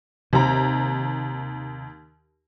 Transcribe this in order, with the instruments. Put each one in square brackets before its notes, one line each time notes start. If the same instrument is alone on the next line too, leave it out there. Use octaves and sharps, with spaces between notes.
[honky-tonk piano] D#2 A#5 [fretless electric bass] C3